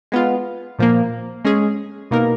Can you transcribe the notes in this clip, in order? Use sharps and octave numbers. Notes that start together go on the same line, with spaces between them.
G#3 B3 F4
A#2 F3 A#3
G#3 C#4 G#4
B2 A#3 D#4 A#4